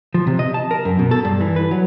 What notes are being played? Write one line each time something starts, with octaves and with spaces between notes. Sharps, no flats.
F3
C3
D#5
A5
A#4
F#2
B2
A4
G2
E3
B4
F#3